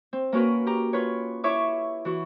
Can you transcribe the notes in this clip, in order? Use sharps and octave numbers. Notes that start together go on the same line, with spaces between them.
C4
A#3 C#4 F#4 A#4 B4
G4 A#5
F4 B4 C#5
E4 C#5 E5 C#6 D6
E3 F#4